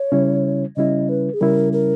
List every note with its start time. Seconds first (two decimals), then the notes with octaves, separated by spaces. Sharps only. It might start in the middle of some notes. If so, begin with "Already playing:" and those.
Already playing: C#5
0.12 C#3 G3 C#4 E4
0.77 C#3 G3 C#4 E4 D#5
1.09 B4
1.34 G#4
1.41 C#3 G3 C#4 E4 A#4
1.73 A#4